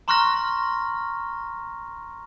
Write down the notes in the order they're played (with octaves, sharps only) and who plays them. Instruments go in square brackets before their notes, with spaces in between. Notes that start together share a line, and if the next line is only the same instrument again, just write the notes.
[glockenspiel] A#5 C6 C#6 F6 F#6 A#6